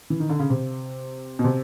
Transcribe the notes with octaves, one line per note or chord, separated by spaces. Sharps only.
E3
D#3
D3
C#3
C3
B2
C3